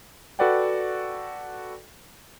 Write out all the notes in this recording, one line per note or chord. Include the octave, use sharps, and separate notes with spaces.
F#4 A4 B4 D5 F#5 G5